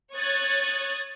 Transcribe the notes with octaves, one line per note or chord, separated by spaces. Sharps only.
C#5 D#6 F#6 G#6 A6